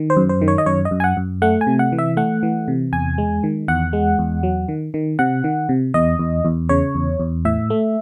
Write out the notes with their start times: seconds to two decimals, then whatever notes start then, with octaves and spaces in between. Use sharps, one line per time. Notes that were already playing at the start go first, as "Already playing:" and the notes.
Already playing: D#3
0.10 C5
0.17 F#2
0.29 C5
0.41 D#3
0.48 C#5
0.58 D#5
0.66 F#2 C#5
0.85 D#5
0.91 F#2
1.00 G#5
1.04 F#5
1.17 F#2
1.42 A3 F#5
1.61 G#5
1.67 C3
1.79 F#5
1.92 E3
1.98 E5
2.17 A3 F#5
2.43 E3
2.68 C3
2.93 E2 G#5
3.18 G#3
3.44 D#3
3.68 E2 F#5
3.93 G#3
4.19 E2
4.43 F#3
4.68 D#3
4.94 D#3
5.19 C3 F#5
5.44 D#3
5.69 C3
5.94 E2 D#5
6.19 E2
6.45 E2
6.69 C#3 C#5
6.95 E2
7.20 E2
7.45 A2 E5
7.70 A3